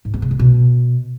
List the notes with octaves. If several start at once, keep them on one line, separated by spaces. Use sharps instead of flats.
G#2
B3
C#3
D3
B2